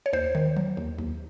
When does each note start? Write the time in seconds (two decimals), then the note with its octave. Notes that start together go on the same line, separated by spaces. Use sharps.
0.06 C#5
0.13 D#2 C5
0.35 D#3
0.57 F#3
0.77 D#2
0.98 D#2